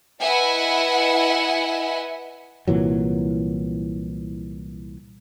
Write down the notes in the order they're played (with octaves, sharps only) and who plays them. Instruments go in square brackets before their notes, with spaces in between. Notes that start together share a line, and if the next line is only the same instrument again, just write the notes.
[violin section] E4 B4 D#5 E5 F#5 G#5
[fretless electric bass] C2 A#2 E3 F#3